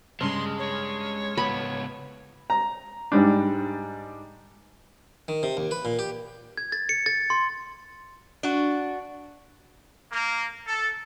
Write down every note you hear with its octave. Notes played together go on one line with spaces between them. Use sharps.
G2 C#3 G#3 C6
C#5
C#2 B3 B5
A#5
G#2 G3 D4
D#3
C3
D#2
B4
A#2
G4
G#6
A6
C#7
A6
C6
D4 F#4
A#3
A4